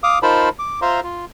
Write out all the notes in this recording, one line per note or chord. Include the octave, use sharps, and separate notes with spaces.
F5 D6 D#6
D#4 F4 A#4 C5 A5 B5
D6
F4 C5 E5 F5 A#5 C6
F4